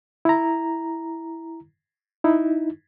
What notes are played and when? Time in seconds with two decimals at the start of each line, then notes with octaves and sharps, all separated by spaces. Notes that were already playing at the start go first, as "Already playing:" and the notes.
0.25 E4 A#5
2.24 D#4 E4